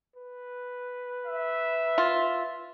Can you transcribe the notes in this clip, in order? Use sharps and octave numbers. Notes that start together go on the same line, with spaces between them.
B4
E5
F4